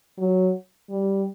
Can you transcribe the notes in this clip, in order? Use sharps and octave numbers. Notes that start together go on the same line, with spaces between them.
F#3
G3